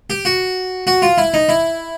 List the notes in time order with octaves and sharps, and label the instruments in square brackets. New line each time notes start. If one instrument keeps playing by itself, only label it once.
[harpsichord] G4
F#4
F#4
F4
E4
D#4
E4